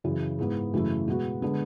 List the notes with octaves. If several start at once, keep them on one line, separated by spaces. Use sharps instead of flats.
F#2 C#3 E3
G#2 G#3 B3 E4
F#2 C#3 E3 A3 E4
B2 G#3 B3 F#4
D3 G#3 B3